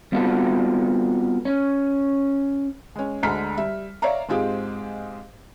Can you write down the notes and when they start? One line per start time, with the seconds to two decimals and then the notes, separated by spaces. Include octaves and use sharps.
0.12 G3 B3 C4 F4 F#4 A4
1.45 C#4
2.96 G#3 C#4
3.23 D2 D3 G#3 A#5 F6 B6
3.57 G3 E5
4.02 C#5 D5 E5 F5 A#5
4.29 G#2 G#3 C4 F4 G4 G#4